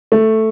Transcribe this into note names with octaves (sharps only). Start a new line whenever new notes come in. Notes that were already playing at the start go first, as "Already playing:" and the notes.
A3